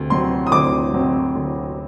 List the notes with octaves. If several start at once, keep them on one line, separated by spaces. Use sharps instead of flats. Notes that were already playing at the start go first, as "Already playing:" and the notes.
Already playing: D2 C3
C3 F#3 C4 C6
D#6
D2 D6
C3 F#3 C4
D2